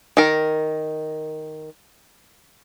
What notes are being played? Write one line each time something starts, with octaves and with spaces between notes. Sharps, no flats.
D#3 A#4